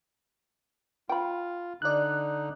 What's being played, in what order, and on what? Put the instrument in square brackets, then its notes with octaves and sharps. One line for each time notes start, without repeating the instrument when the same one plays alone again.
[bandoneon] F4 [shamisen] G5 B5
[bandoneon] D3 D#4 [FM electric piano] D5 F#6